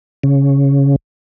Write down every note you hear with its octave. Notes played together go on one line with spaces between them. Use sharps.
C#3